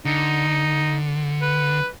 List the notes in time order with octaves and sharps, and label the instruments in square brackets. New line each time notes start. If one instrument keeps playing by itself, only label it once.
[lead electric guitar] D3 [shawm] D#4
[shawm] B4